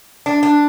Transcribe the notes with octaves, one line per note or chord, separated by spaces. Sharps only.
D4
D4